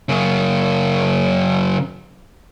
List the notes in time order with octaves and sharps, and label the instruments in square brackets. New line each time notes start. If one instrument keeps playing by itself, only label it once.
[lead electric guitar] F#2 C#3